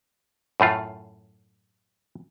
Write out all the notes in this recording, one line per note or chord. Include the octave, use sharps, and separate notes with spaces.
F#2 A2 A3 F4